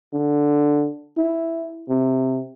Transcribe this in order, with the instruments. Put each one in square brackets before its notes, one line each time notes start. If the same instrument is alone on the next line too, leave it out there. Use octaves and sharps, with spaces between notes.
[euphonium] D3
E4
C3